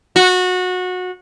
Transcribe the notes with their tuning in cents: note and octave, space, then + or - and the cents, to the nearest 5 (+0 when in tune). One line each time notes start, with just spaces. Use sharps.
F#4 -20